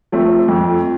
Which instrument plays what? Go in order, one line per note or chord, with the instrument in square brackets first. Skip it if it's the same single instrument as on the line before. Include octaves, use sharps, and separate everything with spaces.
[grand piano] F3 A3 C4
F2